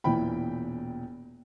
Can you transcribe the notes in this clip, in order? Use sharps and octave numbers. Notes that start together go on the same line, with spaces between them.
E1 A#2 E3 G5 B5